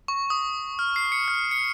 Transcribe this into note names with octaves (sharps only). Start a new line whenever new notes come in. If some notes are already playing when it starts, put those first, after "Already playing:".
C#6
D#6
F6
C7
C#7
F6
C#7